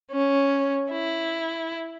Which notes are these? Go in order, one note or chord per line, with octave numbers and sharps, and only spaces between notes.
C#4
E4